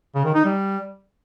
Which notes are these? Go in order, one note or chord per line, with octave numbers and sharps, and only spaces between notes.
C#3
D#3
D#4
G3